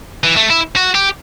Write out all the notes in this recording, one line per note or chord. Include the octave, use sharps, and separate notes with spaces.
E3
A3
E4
F#4
G4